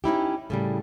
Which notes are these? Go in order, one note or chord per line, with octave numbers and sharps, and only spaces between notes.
C#4 D#4 E4 G4
A2 C#3 G3